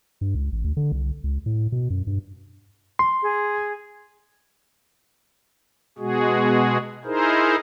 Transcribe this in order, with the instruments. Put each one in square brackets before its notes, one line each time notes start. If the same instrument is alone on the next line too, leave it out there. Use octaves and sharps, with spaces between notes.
[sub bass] G2
C#2
A1
D2
D3
C2
C#2
A2
B2
F#2
G2
[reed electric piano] C6
[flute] G#4
[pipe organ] B2 G#3 F#4 G#4
D#4 E4 G#4 A#4 C5